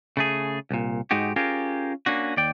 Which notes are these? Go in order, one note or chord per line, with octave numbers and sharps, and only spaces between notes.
C#3 A3 G#4
C2 A#2
G#2 G#3 D#4 F#4 G4
C#4 F4 G4 G#4 A#4
A#3 C#4 D4 F#4
D#2 D5 G5